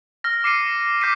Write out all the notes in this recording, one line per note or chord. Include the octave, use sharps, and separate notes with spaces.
F6 A#6
D6 C7 C#7 D#7
D6 G6 B6 C7 D#7